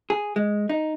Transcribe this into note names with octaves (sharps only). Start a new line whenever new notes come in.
G#4
G#3
D#4